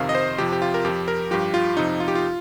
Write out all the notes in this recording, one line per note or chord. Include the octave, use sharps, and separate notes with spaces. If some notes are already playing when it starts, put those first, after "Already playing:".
Already playing: F2 C3 D#3 F5
D#5
C5
F2 C3 F3 G4
G4
F4
A#4
F2 F3 G4
A#4
G2 F3 G4
F4
F2 C3 F3 D#4
F4
G4
F4